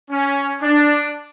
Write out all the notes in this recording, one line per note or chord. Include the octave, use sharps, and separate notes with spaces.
C#4
D4